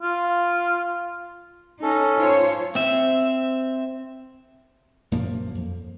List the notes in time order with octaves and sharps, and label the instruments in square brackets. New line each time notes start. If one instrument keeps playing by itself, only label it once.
[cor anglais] F4
[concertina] C#4 A4 [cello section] D#4
[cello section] F4 C5 C#5
[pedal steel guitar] C4 E5
[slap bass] F#2 A#2 F3 A#3
F2